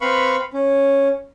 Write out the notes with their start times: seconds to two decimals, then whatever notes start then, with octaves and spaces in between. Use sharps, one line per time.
0.01 C4 B4 F5 B5 C#6
0.53 C#4